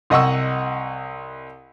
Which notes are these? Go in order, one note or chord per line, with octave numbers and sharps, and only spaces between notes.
C2 D#5 F#5 C#6 E6